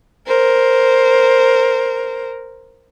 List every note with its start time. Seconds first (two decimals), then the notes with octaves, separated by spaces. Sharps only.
0.27 A#4 C5